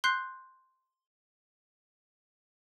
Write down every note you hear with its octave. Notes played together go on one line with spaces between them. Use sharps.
C6 F#6 G6 C7